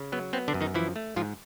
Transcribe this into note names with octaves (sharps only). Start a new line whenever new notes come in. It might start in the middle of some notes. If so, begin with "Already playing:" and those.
Already playing: C#3
F#3 B3
B3 C4
D3 D4
F#2
D#3 D#4
E3 F3 E4
A3
G#2 F3 F4